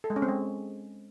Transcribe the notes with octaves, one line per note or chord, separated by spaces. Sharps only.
A4
G#3
C#4
C4
G#3